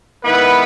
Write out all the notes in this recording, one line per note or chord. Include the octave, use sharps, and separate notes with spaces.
D#3 G#3 B3 E4 B4